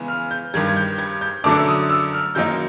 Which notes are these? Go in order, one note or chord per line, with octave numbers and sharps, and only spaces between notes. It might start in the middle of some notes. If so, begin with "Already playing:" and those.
Already playing: C#3 E3 G#3 B3
F6
G6
G2 D#3 G3 G#6
G#6
G6
G#6
G6
F#2 D3 F#3 A3 D4 D6
E6
D#6
E6
F6
F#2 D#3 F#3 A#3 D#4 G6